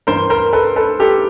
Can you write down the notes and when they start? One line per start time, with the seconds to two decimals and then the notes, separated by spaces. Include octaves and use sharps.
0.07 G2 E3 A#4 C5
0.30 A#4 C5
0.53 A4 B4
0.76 A4 B4
1.00 G4 A4